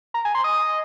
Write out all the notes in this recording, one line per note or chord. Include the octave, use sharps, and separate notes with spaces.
A#4
G#4
C5
D#5